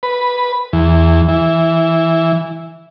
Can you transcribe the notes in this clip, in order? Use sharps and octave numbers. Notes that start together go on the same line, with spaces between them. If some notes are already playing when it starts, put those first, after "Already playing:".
B4
E2
E3